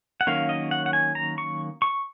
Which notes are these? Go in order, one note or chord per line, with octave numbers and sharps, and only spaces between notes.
F#5
D#3 F#3 A#3 C#4 F5
D#5
F#5
F#5
G#5
A#5
C#6
C#6